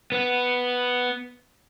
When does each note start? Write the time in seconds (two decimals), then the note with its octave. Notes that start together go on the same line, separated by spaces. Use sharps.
0.12 B3